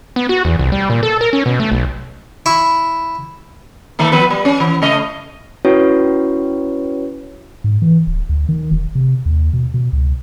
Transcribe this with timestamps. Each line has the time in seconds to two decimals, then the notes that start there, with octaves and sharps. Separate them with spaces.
0.16 B3
0.29 F#4
0.45 E2
0.59 C2
0.72 G3
0.90 A#2
1.03 A4
1.21 A#4
1.33 C#4
1.46 B2
1.60 A3
1.72 B1
2.46 E4 C#6
3.99 D#3 A3 A#3
4.12 F3 B3 B4
4.30 G3
4.45 C#4
4.60 E3
4.82 C#3 A3 D#5
5.65 C#4 E4 F#4 B4 C#5
7.64 G#2
7.82 E3
8.07 D1
8.29 D2
8.49 D#3
8.71 E1
8.95 C3
9.26 D#2
9.53 B2
9.74 B2
9.93 C#2